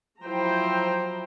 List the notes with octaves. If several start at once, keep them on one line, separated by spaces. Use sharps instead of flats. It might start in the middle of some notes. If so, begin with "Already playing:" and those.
F3 F#3 E4 C5 G5 A#5